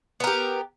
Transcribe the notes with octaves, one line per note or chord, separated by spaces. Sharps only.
B3 G4 A#4